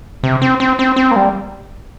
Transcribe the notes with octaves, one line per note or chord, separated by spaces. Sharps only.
C3
C4
C4
C4
C4
A#3
G3